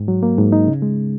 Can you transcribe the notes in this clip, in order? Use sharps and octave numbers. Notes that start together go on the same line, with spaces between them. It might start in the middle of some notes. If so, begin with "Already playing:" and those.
Already playing: G#2
F#3
A#3
G#2
D#4
C#3
G#3